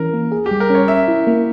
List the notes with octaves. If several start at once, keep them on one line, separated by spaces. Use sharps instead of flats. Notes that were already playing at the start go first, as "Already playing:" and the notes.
Already playing: E3 C#4 A#4
A#3
G#4
G4
G3
A#4
C#4 C#5
C#4 E5
E4
A#3